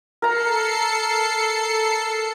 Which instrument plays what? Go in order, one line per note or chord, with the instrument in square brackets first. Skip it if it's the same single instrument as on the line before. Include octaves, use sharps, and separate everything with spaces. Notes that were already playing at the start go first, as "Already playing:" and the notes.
[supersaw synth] A4 C7 C#7 [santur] A#4 A#5